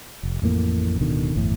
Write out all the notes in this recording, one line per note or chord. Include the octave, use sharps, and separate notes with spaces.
F1
A1 F2 A2 A#3
D1 B2 D3 D#3
G1 E2 A2